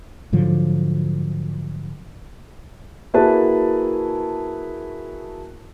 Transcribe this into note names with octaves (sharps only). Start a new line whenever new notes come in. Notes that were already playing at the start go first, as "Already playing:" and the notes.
G#2 D3 F3 F#3
A#3 E4 F#4 G#4 B4 A5